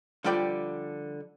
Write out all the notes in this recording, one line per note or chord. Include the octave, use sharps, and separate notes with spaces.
D3 F3 G3 G4 D5 G5